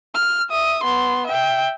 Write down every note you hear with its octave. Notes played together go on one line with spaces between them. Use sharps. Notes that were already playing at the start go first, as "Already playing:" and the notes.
F6
E5 D#6
B3 C6
E5 G5